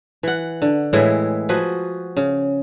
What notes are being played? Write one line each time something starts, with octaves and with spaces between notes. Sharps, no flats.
E3 F#5
D3
A2 E3 G#3 E4
F3 F#4 G#4 B4
C#3